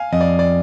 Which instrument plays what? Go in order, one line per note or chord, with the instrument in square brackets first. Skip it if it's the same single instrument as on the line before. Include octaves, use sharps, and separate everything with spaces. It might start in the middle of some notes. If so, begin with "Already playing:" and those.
Already playing: [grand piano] F5 G#5
[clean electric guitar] F2 [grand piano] D#5
[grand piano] D5
D5